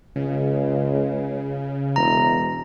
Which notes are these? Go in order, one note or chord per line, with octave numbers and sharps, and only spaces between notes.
C#2 C#3
E1 A#5